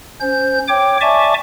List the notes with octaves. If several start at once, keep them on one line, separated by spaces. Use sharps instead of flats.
C#4 C5 G6
C#5 G5 D6
D5 E5 G#5 A5 C#6 D6